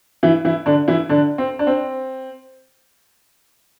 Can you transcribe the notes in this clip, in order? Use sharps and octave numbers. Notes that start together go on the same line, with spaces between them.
E3 E4
E3 E4
D3 D4
E3 E4
D3 D4
C4
D4
C4